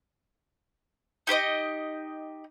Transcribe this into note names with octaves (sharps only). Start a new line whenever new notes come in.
D#4 G4 C#5 D#5